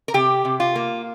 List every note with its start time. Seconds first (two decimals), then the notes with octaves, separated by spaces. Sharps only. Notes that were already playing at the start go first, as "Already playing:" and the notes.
0.08 A#4
0.14 C3 G4
0.45 C3
0.60 F4
0.75 A#3